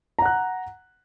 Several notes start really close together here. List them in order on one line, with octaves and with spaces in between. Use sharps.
A#5 F#5 F#6